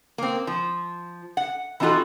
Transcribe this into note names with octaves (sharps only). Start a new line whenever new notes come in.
A#3 C4
F3
F#5
E3 C4 D#4 F4 F#4 A4